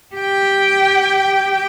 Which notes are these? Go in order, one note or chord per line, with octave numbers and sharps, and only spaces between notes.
G4 G5